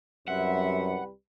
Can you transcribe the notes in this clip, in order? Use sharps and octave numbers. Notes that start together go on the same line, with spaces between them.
C2 F#2 G3 C4 B4 E5 F#5